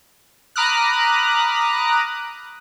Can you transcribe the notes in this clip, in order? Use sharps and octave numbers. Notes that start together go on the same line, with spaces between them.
A#5 B5 D6 D#6 F6 F#6